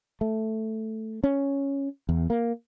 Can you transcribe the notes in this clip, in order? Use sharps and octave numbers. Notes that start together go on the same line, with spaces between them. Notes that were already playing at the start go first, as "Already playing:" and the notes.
A3
C#4
E2
A#3